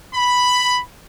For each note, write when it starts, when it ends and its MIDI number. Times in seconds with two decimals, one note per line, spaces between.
0.15 0.79 83